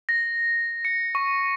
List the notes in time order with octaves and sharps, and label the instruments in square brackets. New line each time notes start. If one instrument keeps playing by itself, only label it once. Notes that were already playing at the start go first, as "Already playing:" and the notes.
[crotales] A#6
C#7
C#6